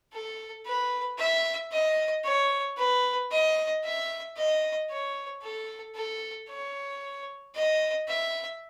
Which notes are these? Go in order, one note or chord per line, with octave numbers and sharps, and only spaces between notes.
A4
B4
E5
D#5
C#5
B4
D#5
E5
D#5
C#5
A4
A4
C#5
D#5
E5